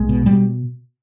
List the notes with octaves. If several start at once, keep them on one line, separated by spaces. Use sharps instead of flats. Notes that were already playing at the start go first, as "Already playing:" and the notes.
Already playing: B1 G#3
B2
B2 G3